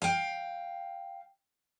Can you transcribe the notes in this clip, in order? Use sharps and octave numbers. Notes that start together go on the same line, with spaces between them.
F5 G5